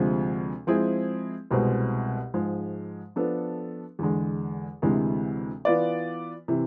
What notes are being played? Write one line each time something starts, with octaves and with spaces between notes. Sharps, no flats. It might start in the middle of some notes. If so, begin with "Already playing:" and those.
Already playing: D2 C3 F3 G#3
F3 G#3 C4 E4 G#4
C2 B2 G#3 C4
G#2 F3 G#3
F3 B3 D4 A4
E2 D3 G#3
D2 C3 E3 G#3
E3 B3 F4 B4 D5
C3 E3